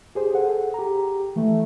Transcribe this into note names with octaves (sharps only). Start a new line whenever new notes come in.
G4 G#4 C5
G#4 A4 F#5
G4 A#5
E3 A3